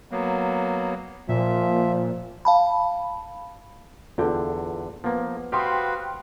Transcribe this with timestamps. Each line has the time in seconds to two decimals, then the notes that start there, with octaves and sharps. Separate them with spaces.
0.11 F#3 A#3 B3
1.29 A#2 F3 E5
2.45 F5 A5 B5
4.18 E2 D3 F4 A4 G5
5.04 F3 A#3 B3
5.52 F#4 G4 B4 C5 F5 G5 C6 D#6